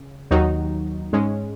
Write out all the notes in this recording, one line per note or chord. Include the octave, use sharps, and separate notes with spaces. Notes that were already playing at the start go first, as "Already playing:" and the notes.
Already playing: C#3
D#2 D#3 F#3 D#4 F#4
G#2 G#3 C#4